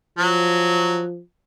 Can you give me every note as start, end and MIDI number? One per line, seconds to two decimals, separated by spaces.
0.19 1.21 53
0.19 1.04 54